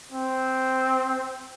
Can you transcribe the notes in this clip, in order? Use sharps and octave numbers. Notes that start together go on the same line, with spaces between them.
C4